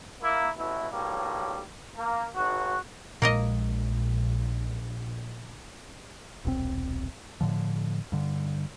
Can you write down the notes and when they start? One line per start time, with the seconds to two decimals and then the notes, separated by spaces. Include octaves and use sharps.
0.22 A#3 E4
0.57 A1 B2 E4
0.90 B1 A2 G3 A#3
1.97 A#3
2.35 G#1 F#4
3.22 A#1 A#2 G#3 A#3 A#4 D#5
6.45 D#1 B1 C3 C4
7.41 A2 D3 F3
8.12 G2 D3